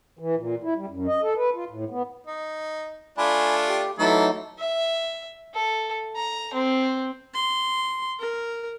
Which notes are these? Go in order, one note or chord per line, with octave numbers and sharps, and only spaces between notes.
E3
A#2
E4
G3
F#2
D#5
A4
B4
F4
A2
B3
D#4
A3 D4 F4 G#5 B5
G4
E3 F#3 A3 D#4 A4
E5
A4
A#5
C4
C6
A#4